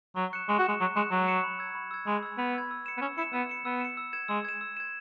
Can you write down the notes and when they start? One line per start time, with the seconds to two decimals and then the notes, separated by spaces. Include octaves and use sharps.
0.16 F#3 C#6
0.33 F#6 C#7 E7
0.49 G#3 C#6
0.59 F#4
0.64 G#3 F#6 C#7 E7
0.80 F#3 C#6
0.96 G#3 F#6 C#7 E7
1.11 F#3 C#6
1.27 F#6 C#7 E7
1.43 B5
1.59 E6 G#6
1.75 B5
1.91 E6 G#6
2.07 G#3 B5
2.23 E6 G#6
2.38 B3 B5
2.55 E6 G#6
2.71 E6
2.86 C#7 E7
2.98 B3
3.01 C#4 E6
3.18 E4 C#7
3.22 E7
3.33 B3 E6
3.49 C#7 E7
3.65 B3 E6
3.81 C#7 E7
3.97 E6
4.13 G#6 E7
4.28 G#3 E6
4.45 G#6 E7
4.61 E6
4.77 G#6 E7